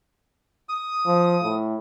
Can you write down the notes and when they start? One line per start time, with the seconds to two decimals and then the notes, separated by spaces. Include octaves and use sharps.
0.69 D#6
1.06 F3
1.43 A2